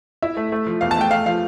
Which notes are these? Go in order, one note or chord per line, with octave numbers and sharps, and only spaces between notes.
E4 E5
A3
A3
F3
E2 F5
A5
A3 G5
A3 F5
F3 F5